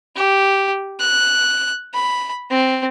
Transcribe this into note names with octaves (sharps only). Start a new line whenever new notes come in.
G4
F#6
B5
C4